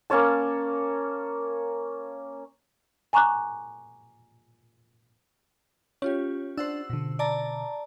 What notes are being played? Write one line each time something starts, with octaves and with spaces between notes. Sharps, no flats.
A#3 C#4 C#5 A5
G#5 A#5 C#6 D6 F#6
C#4 F4 G4 C#5
D4 C5 F#5 E6
B2 D3
D5 A5 A#5